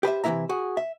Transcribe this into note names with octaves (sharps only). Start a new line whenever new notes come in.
G4 B4 C5 E5
C3 E3 C#4 E4 E5 A#5
F#4 G#4
E5